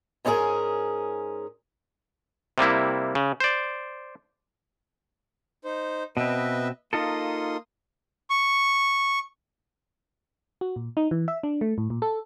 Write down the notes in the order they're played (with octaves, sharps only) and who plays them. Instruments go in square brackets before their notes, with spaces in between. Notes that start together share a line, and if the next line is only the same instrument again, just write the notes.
[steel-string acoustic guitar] G#2 C#4 D#4 E4 G#4 A#4
[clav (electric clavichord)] C3 G3 A#3 E4
C#3
C5 D5
[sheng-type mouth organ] D#4 C5
[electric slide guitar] B2 C4 [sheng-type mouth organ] B4 D#5 E5
[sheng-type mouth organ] A#3 C6 D#6 [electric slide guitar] D#4 F4 A4
[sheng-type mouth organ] C#6
[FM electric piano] F#4
A#2
D#4
E3
E5
D4
A3
A2
A#2
A4